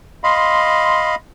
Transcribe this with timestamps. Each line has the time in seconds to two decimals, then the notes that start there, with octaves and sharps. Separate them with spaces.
0.24 D#5 F5 B5 C6